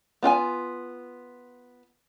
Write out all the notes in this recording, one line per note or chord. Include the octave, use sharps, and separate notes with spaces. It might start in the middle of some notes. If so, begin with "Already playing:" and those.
B3 F4 G5 G#5